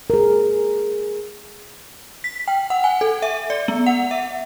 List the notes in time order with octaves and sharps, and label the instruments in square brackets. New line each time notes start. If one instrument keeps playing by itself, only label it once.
[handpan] G#4 A#4
[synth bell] B6
G5
F#5
G#5
A4
E5
D5
B3
F#5
E5